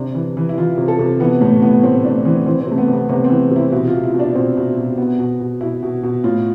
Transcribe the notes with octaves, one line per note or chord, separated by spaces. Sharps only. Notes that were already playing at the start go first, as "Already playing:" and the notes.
Already playing: C3 D4
E3
E3
E4
E3 F4
C3
A4
C3
E3 B3
A2 A3
A2 B3
A2 C4
A2 D4
E3 C4
E3 C4
C4
C3 A3
B3
C3 B3
C3 B3
C4
E3
C3 E4
B2 E4
F4
B2
E4
B2
D4
B2 C4
B2
B2
B2 B3
B2
B2
B2 E4
B2
B2
A2 F4